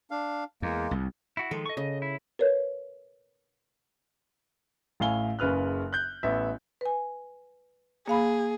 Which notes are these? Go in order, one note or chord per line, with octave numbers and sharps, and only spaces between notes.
D4 F5
E2 G#3 A#3
C2
E4 F#4
D#3 F3 G#3 A4
D#5 C#6
C#3 D#5
E4
A#4 B4 C#5
A1 A2 F5 G#5 G7
F#1 C#3 B4 F6 F#6
F#6 G6
A1 B3 E5
B4 G#5
A#3 G#4 F5 B5